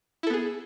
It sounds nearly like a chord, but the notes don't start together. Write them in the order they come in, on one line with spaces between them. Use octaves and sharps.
E4 A4 B3 G#4